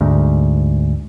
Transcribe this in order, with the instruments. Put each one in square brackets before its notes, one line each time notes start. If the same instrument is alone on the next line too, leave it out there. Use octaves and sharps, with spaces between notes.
[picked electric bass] D2 G#2